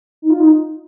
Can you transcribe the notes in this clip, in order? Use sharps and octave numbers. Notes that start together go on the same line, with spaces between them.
D#4
F4
D#4